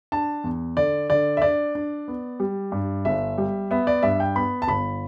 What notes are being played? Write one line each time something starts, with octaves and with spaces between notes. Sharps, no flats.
D4 A5
E2
D3 D5
D3 D5
E5
D4 D5
D4
B3
G3
G2
G1 E5
G3
B3 E5
D5
G2 E5
G5
B3 B5
A5
G1 B5